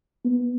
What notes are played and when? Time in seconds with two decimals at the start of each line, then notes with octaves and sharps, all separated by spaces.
0.25 B3